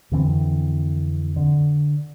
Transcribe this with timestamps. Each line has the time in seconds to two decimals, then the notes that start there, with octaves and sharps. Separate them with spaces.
0.11 F2 D3 E3 C4
1.36 D3